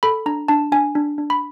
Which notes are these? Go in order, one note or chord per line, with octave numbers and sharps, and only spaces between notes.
A4 B5
D4 A#5
D4 A5
D4 G#5
D4
D4
B5